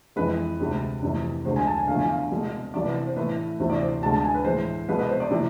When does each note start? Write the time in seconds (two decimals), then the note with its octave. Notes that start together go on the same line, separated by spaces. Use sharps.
0.16 F2 E3 G#3 B4
0.60 D2 C3 G#3
1.02 F2 C3 E3 A3
1.45 D2 D3 G#3 C5
1.56 G#5
1.67 A5
1.77 G#5
1.88 E2 D3 F3 A3 F5
1.99 G#5
2.09 F5
2.31 C2 B2 G#3
2.73 C2 C3 E3 D5
2.84 B4
3.06 C5
3.16 A2 E3 A3 B4
3.59 D2 C3 E3 A3 C5
3.70 D5
3.81 C5
4.02 D2 D3 G#3 A5
4.14 A5
4.24 G#5
4.34 B4
4.45 A2 E3 G#3 C5
4.88 C2 B2 G#3 B4
4.99 B4
5.09 C5
5.20 D5
5.31 C3 E3 A3